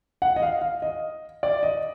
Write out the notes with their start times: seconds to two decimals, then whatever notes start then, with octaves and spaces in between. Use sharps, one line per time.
0.22 F#5
0.36 D#5
0.43 F5
0.61 F5
0.82 D#5
1.43 D5
1.63 D#5